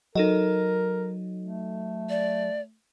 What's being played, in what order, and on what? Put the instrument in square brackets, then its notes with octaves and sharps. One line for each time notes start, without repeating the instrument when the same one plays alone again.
[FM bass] F#3 [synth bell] D#4 A4 D#5 [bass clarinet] A#4
[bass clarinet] A3
[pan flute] D5